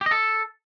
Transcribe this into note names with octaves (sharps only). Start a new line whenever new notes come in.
G4
D#5
A4